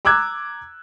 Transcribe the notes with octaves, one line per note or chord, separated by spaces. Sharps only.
A#5 D6 E6 F#6 G#6